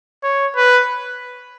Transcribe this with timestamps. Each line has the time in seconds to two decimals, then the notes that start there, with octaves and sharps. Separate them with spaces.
0.23 C#5
0.56 B4